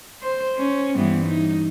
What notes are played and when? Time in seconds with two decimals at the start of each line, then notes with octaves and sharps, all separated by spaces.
0.22 C5
0.58 C#4
0.95 G2 E3 B3
1.26 D#4